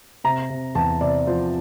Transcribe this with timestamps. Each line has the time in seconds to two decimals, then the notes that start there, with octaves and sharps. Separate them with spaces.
0.24 C3 A#5
0.50 C3
0.75 E2 A5
1.01 C3 D5
1.27 F3 C5